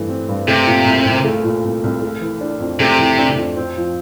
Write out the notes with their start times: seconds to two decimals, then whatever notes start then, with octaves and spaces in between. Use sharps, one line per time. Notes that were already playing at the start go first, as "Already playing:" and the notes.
Already playing: G2 E3 A3
0.08 C4
0.28 G2
0.48 C3 A3
0.67 A#2
0.86 C2
1.05 C2
1.24 A3
1.44 A#2
1.64 C2
1.83 C2
2.02 A3
2.21 E3
2.41 D4
2.60 F2
2.80 C3 A3
2.99 E3
3.19 D4
3.37 F2
3.57 C4
3.77 F3